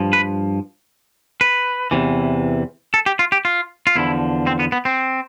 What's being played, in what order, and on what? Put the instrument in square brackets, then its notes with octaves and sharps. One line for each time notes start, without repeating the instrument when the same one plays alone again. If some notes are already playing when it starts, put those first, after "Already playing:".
Already playing: [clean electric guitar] G2 F3
B4
B4
E2 C3 E3
A4
G4
F4
G4
F4
F4
E2 D3 F3 E4
C4
B3
B3
C4